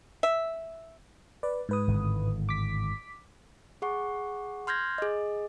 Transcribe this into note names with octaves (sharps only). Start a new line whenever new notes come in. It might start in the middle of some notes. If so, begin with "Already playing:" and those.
E5
B4 D5
G#2 B4 D#6
G#1 A2 D3
D6 B6
G#4 F#5 C#6
C6 F6 G6 G#6 A#6
G#4 D#5